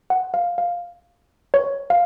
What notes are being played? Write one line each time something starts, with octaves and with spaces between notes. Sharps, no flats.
F#5
F5
F5
C#5
F5